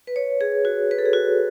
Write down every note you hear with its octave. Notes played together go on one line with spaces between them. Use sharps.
B4
C#5
G#4
F#4
B4
A4
G#4
F#4